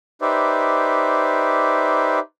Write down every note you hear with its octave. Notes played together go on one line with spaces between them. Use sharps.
D#4 G4 B4 C5 D5 E5